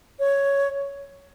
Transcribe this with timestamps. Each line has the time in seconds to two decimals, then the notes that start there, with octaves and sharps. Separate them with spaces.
0.19 C#5